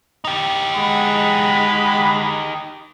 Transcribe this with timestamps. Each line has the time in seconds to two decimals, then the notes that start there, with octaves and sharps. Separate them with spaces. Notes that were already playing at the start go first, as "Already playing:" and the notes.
0.25 D#4 G4
0.75 G#3 F#5 B5